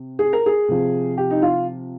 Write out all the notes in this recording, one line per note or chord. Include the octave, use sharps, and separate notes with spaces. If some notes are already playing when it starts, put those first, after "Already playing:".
Already playing: C3
G#4
A#4
G#4
C3 F3
G4
D#4
F4